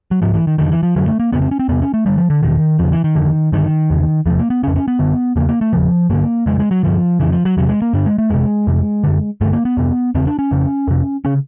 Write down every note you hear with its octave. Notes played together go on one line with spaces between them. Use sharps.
F#3
G#2 F3
E3
D#3
F2 D3 D#3
E3
F3
F#2 D3 F#3
A3
A#3
F2 C#3 B3
C4
C#4
C4
E2 C3 B3
C#4
A3
G2 D3 G3
F3
D3
E2 B2 D#3
E2 C#3 F3
E3
D#3
F2 D3
G2 D3 D#3
E2 C#3
E2 C3 F3
A#3
B3
F2 C#3 C#4
C#4
B3
F#2 D3
E2 C#3 A#3
A#3
A3
E2 C#3 F3
G2 D3 A#3
F2 C#3 G#3
G#3
F#3
G2 D3 F3
F2 C#3 E3
F3
F#3
E2 C3 F#3
G#3
A#3
G2 D3 D4
G#3
A3
F2 C3 G#3
F2 C3
F#2 D3
G2 D3 A3
A#3
B3
F2 C3
E2 C#3 C4
D4
C#4
F2 C#3
F2 C3
C#3 C#4